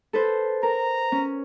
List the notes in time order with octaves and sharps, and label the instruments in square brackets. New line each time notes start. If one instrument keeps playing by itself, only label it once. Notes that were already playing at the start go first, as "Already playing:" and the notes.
[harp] A4 B4 C5
[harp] A#4 [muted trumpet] A#5
[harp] C#4